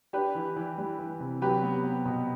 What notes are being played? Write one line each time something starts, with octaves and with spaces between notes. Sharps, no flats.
D4 G4 B4
E3
E3
G3
E3
C3
F#3 G4 B4
B3
B3
B2